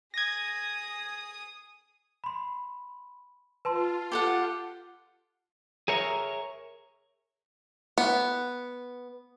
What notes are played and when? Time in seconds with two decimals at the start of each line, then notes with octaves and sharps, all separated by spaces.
0.14 G#4 D#6 G#6 A#6
2.24 B5 C6
3.65 F4 B4 A5 C6
4.12 G4 A4 F#5
5.88 G#4 A#4 C#5 E5 A#5
7.98 B3